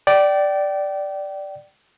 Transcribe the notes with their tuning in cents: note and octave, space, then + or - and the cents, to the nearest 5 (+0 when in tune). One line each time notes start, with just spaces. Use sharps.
D5 +0 G5 -30